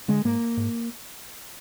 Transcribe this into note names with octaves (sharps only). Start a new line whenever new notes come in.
D3 G#3
G#2 A#3
G#2